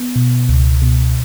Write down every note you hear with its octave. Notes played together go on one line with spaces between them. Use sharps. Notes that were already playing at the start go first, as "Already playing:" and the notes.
Already playing: B3
B2
C#2
B2